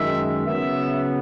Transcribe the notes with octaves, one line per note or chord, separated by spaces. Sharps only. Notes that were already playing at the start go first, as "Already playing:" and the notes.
Already playing: F#2 D#3 G#3 E5
C#3 F#3 B3 E5